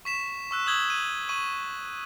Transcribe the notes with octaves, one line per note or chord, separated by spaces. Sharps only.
C#6 B6 E7
C#6 E6 F#6
D#6 E6 G6 G#6 F#7 G7
D#7
C#6 D#7 F#7